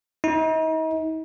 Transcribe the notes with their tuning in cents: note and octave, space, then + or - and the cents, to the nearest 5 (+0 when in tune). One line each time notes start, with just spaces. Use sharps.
D#4 +40